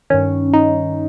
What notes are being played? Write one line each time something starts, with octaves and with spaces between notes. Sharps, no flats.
G2 D#3 C#4
D#4